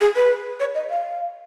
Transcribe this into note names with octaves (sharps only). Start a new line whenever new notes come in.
G#4
B4
C#5
D#5
F5